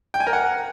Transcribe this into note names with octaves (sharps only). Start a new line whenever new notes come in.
G5
G#5
A#4
F#5